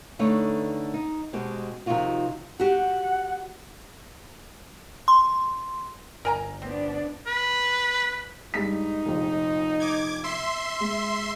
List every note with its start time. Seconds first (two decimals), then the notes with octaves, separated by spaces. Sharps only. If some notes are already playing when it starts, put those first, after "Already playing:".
0.19 D3 A3 D#4 B4 C#5
0.94 D#4
1.33 B2 G#3 C4 F#4 G4
1.86 C3 D#3 F3 D#4 F4 F#4
2.59 F#4 G4 F#5
5.08 C6
6.25 G1 A#4 G#5 A#5
6.62 B3 C4 D4
7.27 B4
8.54 G2 G#3 D#4 B6
9.05 F1 A#1
9.80 D6 G#6
10.24 E5 C6
10.80 G#3